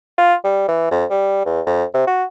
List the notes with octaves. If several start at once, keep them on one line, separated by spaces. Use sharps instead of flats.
F4
G3
E3
F2
G3
E2
F2
C3
F#4